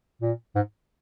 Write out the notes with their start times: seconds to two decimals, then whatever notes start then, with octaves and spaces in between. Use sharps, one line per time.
0.21 A#2
0.55 G#2